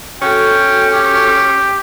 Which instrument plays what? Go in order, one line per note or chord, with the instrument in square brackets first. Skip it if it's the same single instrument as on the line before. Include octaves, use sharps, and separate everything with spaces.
[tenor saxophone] C#4 [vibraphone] F#4 A4 [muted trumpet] G5
[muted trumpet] G4